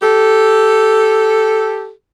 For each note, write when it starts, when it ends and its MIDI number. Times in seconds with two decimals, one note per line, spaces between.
0.02 1.91 67
0.02 1.91 69